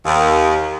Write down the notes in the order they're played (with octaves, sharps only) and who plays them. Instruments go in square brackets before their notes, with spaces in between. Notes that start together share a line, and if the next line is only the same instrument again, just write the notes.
[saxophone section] D#2